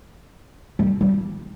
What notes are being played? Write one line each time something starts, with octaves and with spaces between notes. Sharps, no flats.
G3
G3